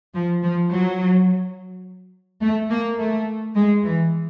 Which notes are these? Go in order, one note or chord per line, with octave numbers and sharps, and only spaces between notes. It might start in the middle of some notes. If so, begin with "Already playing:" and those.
F3
F3
F#3
A3
A#3
A3
G#3
E3